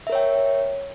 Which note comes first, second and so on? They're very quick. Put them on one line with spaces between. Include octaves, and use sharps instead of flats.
E5 A#4 C#5 G5